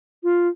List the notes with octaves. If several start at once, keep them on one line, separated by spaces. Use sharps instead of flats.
F4